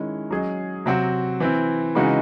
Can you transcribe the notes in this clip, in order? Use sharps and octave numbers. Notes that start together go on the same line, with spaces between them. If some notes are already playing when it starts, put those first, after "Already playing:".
Already playing: D#3 G#3 C#4 E4
F#3 C#4 G#4 D#5
C3 F#3 C4 F#4
E3 C4 E4
C#3 E3 G#3 D#4 F#4